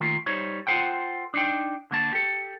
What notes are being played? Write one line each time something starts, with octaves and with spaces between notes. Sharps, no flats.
D#3 A3 A#3 F4
G3 D#4 C5 C#5
F4 F#4 A4 C5 F#5 G5
D4 D#4 G5
D3 A#3 A5
G4 A4